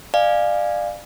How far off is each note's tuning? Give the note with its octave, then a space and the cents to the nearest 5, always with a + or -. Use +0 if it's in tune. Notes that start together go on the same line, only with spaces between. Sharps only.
D5 +30 F5 +0 G#5 +0